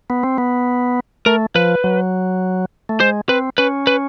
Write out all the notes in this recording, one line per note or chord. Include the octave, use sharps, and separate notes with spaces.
B3
C4
B3
A3 A#4
F3 B4
F#3
A3
G#3 C5
C4 B4
C#4 B4
B4